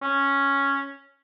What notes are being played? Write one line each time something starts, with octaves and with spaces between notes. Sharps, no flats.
C#4